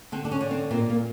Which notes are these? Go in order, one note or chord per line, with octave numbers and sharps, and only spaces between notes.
D3 C4
D4
C#4
D3
C4
A#2 C4
A#3